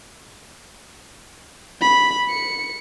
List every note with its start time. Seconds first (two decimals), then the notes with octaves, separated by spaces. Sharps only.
1.81 B5
2.30 C#7